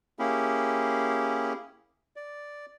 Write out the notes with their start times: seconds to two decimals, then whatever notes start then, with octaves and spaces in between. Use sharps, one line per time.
0.19 A#3 C#4 E4 G4 G#4
2.16 D5